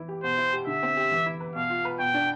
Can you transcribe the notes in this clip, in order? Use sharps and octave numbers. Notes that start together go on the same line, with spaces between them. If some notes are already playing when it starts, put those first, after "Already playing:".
Already playing: E3 E4
G4
B2 C5
E4
G4
D3 E5
C4
G4
E3
E4
B4
B2 F5
F4
B4
B2 G5
D4